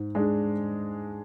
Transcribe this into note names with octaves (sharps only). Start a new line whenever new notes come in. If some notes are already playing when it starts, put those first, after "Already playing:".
Already playing: G#2
G#3 D4 G#4